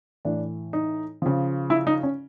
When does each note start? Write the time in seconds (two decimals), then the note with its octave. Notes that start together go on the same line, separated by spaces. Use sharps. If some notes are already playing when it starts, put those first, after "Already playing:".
0.25 A2 E3 D4
0.73 D#4
1.22 C#3 F3
1.70 E4
1.87 D#4
2.03 C#4